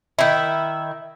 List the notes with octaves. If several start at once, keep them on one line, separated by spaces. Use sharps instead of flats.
D#3 E4